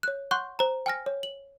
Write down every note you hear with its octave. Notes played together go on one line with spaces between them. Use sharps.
C#5 F#6
F#5 C6 C#6 F#6 G6
C5 A#5
G5 G#5 F6 A#6
C#5
F#7